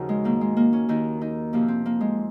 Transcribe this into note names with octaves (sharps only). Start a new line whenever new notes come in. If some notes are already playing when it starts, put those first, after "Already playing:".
Already playing: D#2 C#3 F3 D#4 F#4
G#3
G#2 D#3 A#3
G#3
A#3
C#4
D#2 D#3 D#4
D#4
F2 C3 F3 A#3
C4
A#3
G#3